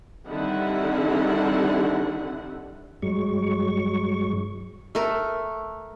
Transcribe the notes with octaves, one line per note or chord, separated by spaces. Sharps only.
D3 D#3 G3 C4 E4 F#5
G2 F#3 G#3 C#6
A3 A#4